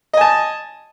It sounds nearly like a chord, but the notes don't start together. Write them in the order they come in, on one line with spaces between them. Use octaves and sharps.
D#5 G#5 A5